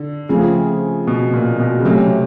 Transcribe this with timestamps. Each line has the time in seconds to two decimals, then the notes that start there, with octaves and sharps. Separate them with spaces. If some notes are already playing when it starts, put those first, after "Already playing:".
Already playing: D3
0.29 C#3 F3 A3 C4 F4 G#4
1.07 B2
1.33 A#2
1.60 B2
1.80 C#3
1.85 C3 F#3 A3 C#4